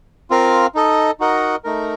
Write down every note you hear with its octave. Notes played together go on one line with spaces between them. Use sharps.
C4 F4 A#4 F5
D#4 A4 D#5
D#4 F#4 A#4 D#5 F#5
A3 D#4 A#4